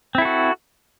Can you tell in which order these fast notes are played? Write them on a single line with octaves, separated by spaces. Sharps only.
C4 E4 A4 F#4